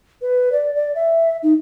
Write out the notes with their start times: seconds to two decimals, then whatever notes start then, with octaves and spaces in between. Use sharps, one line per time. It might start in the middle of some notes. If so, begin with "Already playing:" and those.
0.22 B4
0.52 D5
0.75 D5
0.95 E5
1.43 D#4